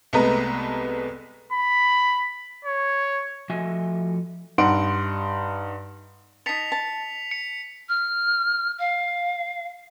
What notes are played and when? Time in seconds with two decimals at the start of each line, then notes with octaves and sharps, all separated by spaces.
0.13 C2 G#3 A3 B3 B4 A#5
1.53 B5
2.65 C#5
3.50 F3 A3 F#4 D#5 E5 G#5
4.58 G2 D#4 F#5 C6 D7
6.46 D#4 A5 B6 C#7 F7
6.72 A5
7.31 C#7
7.89 F6
8.79 F5